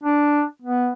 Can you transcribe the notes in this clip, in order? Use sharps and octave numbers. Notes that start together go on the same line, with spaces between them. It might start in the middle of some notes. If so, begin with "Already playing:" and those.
D4
B3